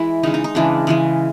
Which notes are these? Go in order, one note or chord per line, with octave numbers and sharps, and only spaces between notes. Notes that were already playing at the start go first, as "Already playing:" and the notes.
Already playing: E3 G#3 E4
C#3 E3 G#3 D#4
D#4
D#4
C#3 E3 G#3 D4
C#3 E3 G#3